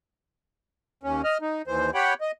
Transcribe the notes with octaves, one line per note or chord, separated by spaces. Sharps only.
D#2 C#4
D#5 F6
D#4
D#2 E3 C5
G4 C#5 F#5 G5 B5
D#5